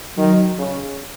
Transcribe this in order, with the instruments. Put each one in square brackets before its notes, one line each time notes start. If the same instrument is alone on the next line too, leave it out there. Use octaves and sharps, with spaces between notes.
[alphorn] D#3 [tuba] F#3
[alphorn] C#3